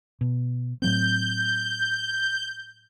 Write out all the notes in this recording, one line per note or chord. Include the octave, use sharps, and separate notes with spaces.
B2
A2 F#3 C4 G6